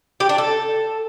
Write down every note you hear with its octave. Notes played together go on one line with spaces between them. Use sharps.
G4
D4
A4